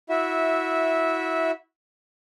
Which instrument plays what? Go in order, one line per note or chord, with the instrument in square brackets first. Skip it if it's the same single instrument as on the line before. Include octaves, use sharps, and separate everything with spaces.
[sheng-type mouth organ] E4 F#4 E5